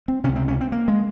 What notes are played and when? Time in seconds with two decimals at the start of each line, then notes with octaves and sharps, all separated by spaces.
0.08 C4
0.24 C#2 C3 C#4
0.36 C4
0.48 C#4
0.61 C4
0.72 A#3
0.88 G#3